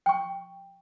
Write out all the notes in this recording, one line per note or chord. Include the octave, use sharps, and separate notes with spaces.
G5 C#6